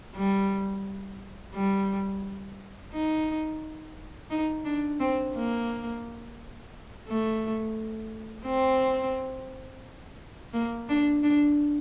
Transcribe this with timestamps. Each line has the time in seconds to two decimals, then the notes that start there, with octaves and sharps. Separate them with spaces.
0.15 G3
1.54 G3
2.93 D#4
4.30 D#4
4.65 D4
5.00 C4
5.35 A#3
7.08 A3
8.46 C4
10.54 A#3
10.89 D4
11.23 D4